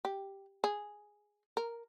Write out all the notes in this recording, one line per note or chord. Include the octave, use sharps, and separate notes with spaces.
G4
G#4
A#4